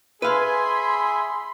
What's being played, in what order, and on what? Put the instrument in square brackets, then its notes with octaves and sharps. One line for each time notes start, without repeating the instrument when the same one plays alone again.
[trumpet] G#4 [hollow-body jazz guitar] B4 F5 [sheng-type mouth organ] E5 G#5 [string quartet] B5 C6